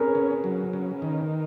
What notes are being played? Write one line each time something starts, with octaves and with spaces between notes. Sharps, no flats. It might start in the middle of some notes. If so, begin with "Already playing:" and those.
Already playing: C#4 G#4 A#4 B4
C#3
F#3
C#3
D#3